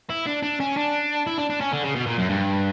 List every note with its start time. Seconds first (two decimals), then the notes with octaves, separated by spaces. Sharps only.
0.10 E4
0.26 D4
0.43 D4
0.60 C#4
0.77 D4
1.27 E4
1.38 D4
1.50 D4
1.61 C#4
1.72 D3
1.84 C#3
1.95 B2
2.06 A#2
2.18 F#2
2.29 G2